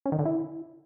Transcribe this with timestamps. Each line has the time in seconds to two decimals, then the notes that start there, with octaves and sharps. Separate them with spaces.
0.06 C#4
0.12 D#3
0.19 D3
0.25 E4